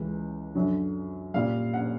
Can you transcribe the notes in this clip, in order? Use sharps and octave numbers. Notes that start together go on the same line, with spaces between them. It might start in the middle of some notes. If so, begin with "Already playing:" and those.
Already playing: C#2 C#3 E3 G#3
F#2 D3 F#3
A#2 G3 F5
F#5